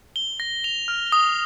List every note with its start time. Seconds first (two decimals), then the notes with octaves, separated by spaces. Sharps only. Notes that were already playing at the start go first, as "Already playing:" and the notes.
0.16 G7
0.40 A#6
0.64 F7
0.88 F6
1.12 D#6